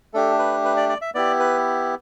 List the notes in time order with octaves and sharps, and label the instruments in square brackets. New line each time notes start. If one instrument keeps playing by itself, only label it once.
[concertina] A3 D4 G4 A4
B4
B4
D5
D5
E5
B3 E4 G4 D5
B4